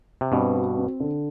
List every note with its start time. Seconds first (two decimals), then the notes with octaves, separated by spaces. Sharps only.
0.21 C3
0.32 G2 B2 C4
0.55 F#4
0.78 C4
1.00 D3